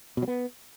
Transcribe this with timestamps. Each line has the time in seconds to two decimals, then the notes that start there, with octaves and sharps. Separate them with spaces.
0.17 B2
0.22 F#3
0.28 B3